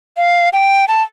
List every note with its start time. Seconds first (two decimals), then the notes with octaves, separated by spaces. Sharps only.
0.17 F5
0.53 G5
0.88 A5